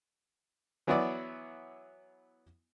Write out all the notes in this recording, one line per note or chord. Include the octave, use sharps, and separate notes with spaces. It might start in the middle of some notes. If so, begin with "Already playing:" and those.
E3 F#3 B3 E4 F#4 D5